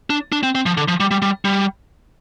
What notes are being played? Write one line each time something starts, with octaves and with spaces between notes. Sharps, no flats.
D4
D4
C4
C4
F3
D3
F3
G3
G3
G3
G3